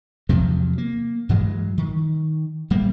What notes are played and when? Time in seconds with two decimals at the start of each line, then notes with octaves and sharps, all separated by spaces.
0.29 E2 C3 F3 F#3
0.78 A#3
1.29 G2 E3 F#3 G#3
1.78 D#3
2.70 D1 G3 A#3